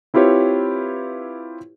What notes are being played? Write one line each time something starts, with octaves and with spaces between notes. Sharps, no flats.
C4 E4 F4 G4 B4 C#5